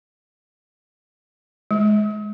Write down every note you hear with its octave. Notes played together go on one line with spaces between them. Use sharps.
G#3